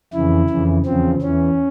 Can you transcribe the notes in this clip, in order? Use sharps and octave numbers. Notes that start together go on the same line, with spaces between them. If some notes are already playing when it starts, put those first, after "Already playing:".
F2 C#3 E3 E4
F2 C#3 E3
E2 C#3 F3 C4
E2 E3 C#4